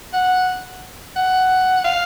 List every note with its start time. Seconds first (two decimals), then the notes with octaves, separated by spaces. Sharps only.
0.13 F#5
1.16 F#5
1.84 F5